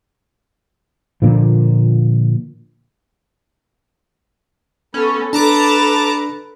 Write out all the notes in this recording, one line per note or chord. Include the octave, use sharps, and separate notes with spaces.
A#2 D3 F3
B3 C#4 A4
D4 A4 B4 A5 A#5 D6